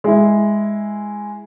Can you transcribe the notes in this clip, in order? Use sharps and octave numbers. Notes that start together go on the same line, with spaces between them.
G#3 E4